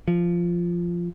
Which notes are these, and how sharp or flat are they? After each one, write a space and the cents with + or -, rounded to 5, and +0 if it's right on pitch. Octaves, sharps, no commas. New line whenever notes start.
F3 -10